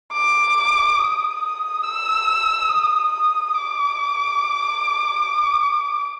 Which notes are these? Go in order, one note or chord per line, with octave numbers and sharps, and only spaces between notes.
D6
D#6
E6
D#6
D#6
D6